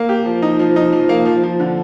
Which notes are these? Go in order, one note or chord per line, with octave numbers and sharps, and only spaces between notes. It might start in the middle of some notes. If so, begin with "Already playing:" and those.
Already playing: A#3
G4
F3
D#4
F3
D#4
F3
A#3
F3
F3
D3